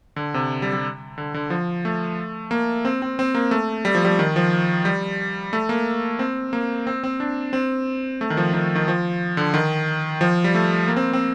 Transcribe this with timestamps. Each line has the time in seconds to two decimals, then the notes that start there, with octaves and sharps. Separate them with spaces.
0.16 D3
0.34 C3
0.62 G3
0.73 G3
1.18 D3
1.34 D3
1.50 F3
1.85 A3
2.51 A#3
2.85 C4
3.02 C4
3.19 C4
3.35 A#3
3.51 A3
3.85 G3
3.95 F3
4.05 G3
4.19 D#3
4.36 F3
4.85 G3
5.53 A3
5.69 A#3
6.19 C4
6.53 A#3
6.87 C4
7.04 C4
7.20 D4
7.53 C4
8.21 A3
8.30 D#3
8.37 F3
8.53 D#3
8.75 D#3
8.88 F3
9.37 D3
9.54 D#3
10.21 F3
10.44 G3
10.55 A3
10.88 A#3
10.97 C4
11.13 C4